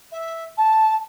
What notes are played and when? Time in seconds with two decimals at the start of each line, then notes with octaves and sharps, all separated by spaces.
0.11 E5
0.57 A5